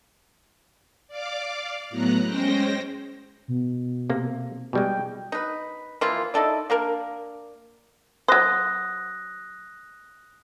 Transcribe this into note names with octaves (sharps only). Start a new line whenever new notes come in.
D5 F5 D6
A2 F#3 B3 A#5 F#6
G#3 C#4 C5 G5 A#6
B2
C3 A#3
B2 G3 G#3 G5
D#4 B4
E3 F3 A#3 F4
D#4 E4 A4 D5
A#3 D4 A#4
F#3 C5 D#6 F#6 A#6